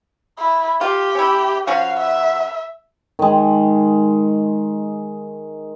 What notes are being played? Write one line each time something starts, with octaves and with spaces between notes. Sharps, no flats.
E4
F4 G4
C#4 E4
F3 C#4 F#4 F5
E5
D#3 G#3